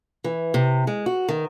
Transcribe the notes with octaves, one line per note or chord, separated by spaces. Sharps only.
E3
C3
G#3
F#4
D#3